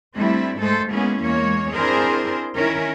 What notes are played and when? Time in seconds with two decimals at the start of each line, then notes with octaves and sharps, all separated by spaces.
0.17 G3 A3 C4 D4 E4
0.58 G#2 G#3 A3 A4 C5
0.90 G#3 A#3 B3 C#4 E4 G#4
1.22 E2 G#3 A#3 C#5
1.74 C4 D4 E4 G#4 A#4 C5
2.55 D#3 C#4 E4 A#4